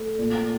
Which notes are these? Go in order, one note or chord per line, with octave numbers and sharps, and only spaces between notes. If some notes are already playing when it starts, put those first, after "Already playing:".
Already playing: A3
A#2